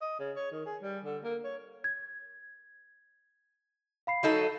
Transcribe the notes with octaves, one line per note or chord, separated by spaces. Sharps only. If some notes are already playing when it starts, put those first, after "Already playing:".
D#5
C#3
C#5
D#3
G#4
G3
D3
A#3
C#5
G#6
F5 B5 C7
F#3 D#4 A4